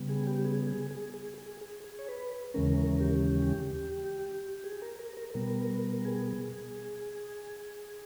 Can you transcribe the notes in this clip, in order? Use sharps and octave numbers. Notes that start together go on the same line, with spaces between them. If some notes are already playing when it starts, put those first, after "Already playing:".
Already playing: C#3 G3 B3
G#4
G4
G#4
G#4
G#4
G#4
G#4
G#4
G#4
C#5
B4
D#2 C#3 E3 G#3 C#4 A#4
A#4
G4
G#4
A#4
A#4
A#4
B2 G3 B3 A#4
G#4